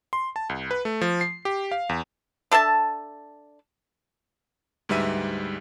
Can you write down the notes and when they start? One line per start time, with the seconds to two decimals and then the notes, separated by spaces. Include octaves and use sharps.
0.13 C6
0.36 A5
0.49 C2
0.71 B4
0.85 A3
1.01 F3
1.21 C7
1.45 G4
1.71 F5
1.89 E2
2.51 D4 A4 E5 A5
4.89 D2 G#2 G3 B4 E5 D#7